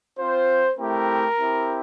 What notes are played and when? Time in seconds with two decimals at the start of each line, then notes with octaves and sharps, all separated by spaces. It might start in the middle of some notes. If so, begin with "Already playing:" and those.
0.19 C4 F4 C5
0.78 A3 C4 E4 G4 A#4
1.39 C4 E4 G4